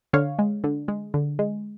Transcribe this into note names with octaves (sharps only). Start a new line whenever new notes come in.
D3 C#5 F5
G#3
D3
G#3
D3
G#3